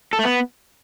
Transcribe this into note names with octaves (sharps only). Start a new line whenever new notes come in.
A4
A3
B3